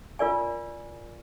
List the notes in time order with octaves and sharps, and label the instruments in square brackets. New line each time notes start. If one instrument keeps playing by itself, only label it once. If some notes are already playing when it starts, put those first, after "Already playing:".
[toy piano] F4 A#4 D5 G#5